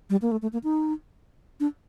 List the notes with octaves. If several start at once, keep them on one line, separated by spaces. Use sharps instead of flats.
G3
A#3
A3
A3
A#3
D#4
D4